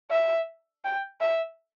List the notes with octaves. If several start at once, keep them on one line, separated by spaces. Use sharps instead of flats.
E5
G5
E5